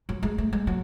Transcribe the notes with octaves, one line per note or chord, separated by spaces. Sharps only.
F#3
G#3
A3
G#3
F#3